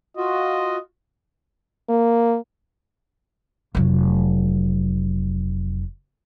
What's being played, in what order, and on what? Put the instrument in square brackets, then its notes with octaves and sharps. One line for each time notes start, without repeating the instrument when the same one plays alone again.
[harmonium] F4 F#4 [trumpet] D#5
[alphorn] A#3
[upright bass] F1 F#3